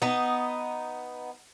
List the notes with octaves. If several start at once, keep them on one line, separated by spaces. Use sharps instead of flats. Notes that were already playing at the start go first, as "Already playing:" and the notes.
B3 D#4